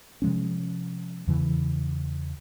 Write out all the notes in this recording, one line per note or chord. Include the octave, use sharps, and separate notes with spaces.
C3 F3 G#3 C#4
E2 C#3 E3